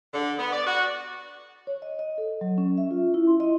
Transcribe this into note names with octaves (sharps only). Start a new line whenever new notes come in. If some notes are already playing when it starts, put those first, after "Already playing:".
D3
B3
D5
F#4
C#5
D#5
D#5
A4
F#3
C#4
E5
F4
E4
C6
D#5